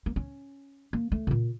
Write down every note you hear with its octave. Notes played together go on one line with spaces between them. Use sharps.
A#3
C#4
A#3
A3
A2
A#2